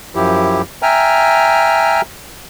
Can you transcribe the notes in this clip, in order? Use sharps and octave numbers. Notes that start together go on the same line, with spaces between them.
F#2 F3 E4 G4
E5 G5 G#5 A#5 F6